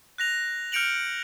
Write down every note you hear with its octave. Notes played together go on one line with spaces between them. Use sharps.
F#6 A#6 F7
F6 G6 C#7 D7 F7 F#7